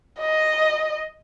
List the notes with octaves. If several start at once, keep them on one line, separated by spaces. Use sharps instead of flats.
D#5